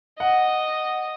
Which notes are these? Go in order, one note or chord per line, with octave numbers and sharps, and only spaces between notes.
D#5 F#5